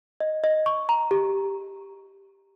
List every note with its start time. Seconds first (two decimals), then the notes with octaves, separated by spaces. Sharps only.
0.20 D#5
0.44 D#5
0.66 C#6
0.89 A#5
1.11 G4